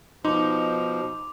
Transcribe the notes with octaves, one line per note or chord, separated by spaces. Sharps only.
B2 F3 D#4 C6 D6 F7